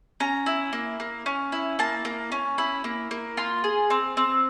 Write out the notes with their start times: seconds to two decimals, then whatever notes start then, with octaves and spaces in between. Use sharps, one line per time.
0.20 C#4 A#5
0.46 E4
0.73 A#3
1.00 A#3
1.26 C#4
1.52 E4
1.79 A#3 A5
2.05 A#3
2.32 C#4
2.58 E4 B5
2.84 A#3
3.11 A#3
3.37 F4 C6
3.64 G#4
3.90 C4
4.17 C4